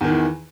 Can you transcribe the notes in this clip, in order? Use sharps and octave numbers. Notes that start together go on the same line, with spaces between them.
E2 D#3 E3